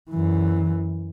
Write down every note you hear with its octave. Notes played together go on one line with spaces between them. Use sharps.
F#2 E3